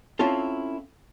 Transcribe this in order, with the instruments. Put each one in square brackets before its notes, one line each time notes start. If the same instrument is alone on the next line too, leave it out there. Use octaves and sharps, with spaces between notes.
[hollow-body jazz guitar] C4 C#4 E4 F4 A4